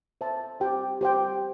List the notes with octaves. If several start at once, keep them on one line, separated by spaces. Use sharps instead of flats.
C5 E5 A5
G4 C5 G5
G4 C5 G5